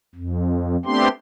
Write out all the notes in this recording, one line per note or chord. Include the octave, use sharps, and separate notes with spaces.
F2
A3 B3 C4 D4 G4 C6